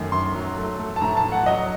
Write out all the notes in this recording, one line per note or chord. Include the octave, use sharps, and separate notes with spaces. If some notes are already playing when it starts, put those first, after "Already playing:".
Already playing: F#2 D#3 A3
F#2 C6
F#3
A3
A3
A5
A2 A#5
A5
A2
F#5
F#3 D#5